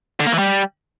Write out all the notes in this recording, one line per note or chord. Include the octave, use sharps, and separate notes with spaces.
D3
A#3
E3
G3